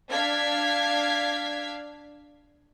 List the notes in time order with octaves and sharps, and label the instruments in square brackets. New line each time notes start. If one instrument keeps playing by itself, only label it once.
[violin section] D4 F5 G#6 B6